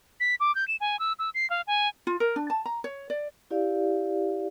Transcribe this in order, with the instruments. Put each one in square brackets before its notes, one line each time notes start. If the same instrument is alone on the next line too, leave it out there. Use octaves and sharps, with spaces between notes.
[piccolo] B6
D6
G6
E7
G#5
E6
E6
C7
F5
G#5
[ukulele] F4
A#4
D4
A5
A#5
C#5
D5
[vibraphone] E4 G4 D5 F5